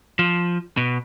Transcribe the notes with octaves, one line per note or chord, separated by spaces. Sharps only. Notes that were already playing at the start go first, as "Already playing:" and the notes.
F3
B2